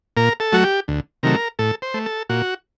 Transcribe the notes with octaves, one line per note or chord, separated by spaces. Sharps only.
A#2 A#4
A4
F#3 A3 F#4
G4
D2
C3 D#3 F#3 A3 A#4
A2 A4
C5
A3
A4
A#2 F#4